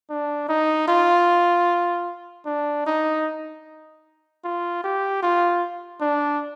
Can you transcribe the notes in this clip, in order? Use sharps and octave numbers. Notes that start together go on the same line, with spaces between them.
D4
D#4
F4
D4
D#4
F4
G4
F4
D4